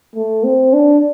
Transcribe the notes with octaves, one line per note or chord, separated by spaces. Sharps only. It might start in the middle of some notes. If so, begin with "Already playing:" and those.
A3
C4
D4